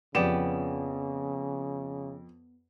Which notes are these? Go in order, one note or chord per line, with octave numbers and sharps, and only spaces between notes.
F2 C#3 B3 G4 D5 E7